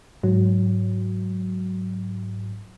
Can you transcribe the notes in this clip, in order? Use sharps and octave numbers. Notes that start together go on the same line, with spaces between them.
G#2 F#3